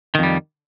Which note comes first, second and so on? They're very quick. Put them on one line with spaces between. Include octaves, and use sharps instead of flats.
D#3 F2 G3